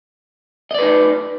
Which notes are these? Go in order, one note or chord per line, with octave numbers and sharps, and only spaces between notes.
D#4 B4 D5 D#5